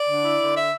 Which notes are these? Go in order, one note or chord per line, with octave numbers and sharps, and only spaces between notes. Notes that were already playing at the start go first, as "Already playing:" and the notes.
Already playing: D5
D3
E4
D3
E5